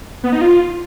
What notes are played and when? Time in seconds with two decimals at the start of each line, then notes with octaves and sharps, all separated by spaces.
0.24 B3
0.32 D#4
0.41 F4